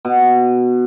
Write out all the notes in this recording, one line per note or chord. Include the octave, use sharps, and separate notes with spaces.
B2